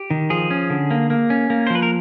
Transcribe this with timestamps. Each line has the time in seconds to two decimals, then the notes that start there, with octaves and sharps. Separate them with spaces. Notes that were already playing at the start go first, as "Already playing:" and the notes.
Already playing: G4
0.10 D#3
0.30 F3 G#4
0.51 C#4
0.70 D3
0.91 A#3
1.10 A#3
1.30 C#4
1.50 A#3
1.67 C5
1.70 F3 B4
1.82 A#4